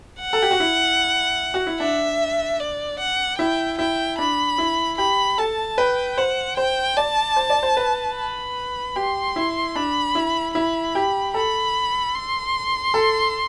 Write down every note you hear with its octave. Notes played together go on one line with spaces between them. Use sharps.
F#5
A4
G4
F#4
E4
F#4
E4
D4 E5
D5
F#5
E4 G5
E4 G5
D4 B5
E4
G4 B5
A4 A5
B4 G5
C5 F#5
C5 G5
D5 A5
C5
D5
C5
B4
B5
G4 C6
E4
D4 B5
E4
E4 B5
G4
A4 B5
C6
A4